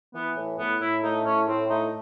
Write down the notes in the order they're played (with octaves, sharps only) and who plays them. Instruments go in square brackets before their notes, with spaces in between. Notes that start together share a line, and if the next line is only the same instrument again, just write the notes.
[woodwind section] E3 [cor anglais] B3
[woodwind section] A2
[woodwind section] A2 [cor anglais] B3
[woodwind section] A2 [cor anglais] E4
[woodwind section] A3 [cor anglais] D#4
[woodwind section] A2 [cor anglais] C#4
[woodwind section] A2 [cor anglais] C4
[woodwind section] A3 [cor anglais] D#4